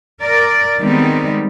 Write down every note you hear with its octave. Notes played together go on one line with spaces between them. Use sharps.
A#4 D5
D#3 G3 G#3 B3 C4 D#4